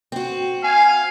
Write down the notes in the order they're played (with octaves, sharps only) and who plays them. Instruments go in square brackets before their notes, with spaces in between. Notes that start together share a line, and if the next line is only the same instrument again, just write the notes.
[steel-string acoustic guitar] C4 F#4
[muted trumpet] F5 [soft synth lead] G#5